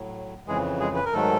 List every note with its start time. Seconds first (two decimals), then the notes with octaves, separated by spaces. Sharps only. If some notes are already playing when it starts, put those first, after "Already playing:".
Already playing: A2 F#3
0.47 F2 C#3 E3 G#3 G#4
0.80 G#3 G#4
0.96 B4
1.05 A#4
1.13 G#2 D#3 F#3 A3 A4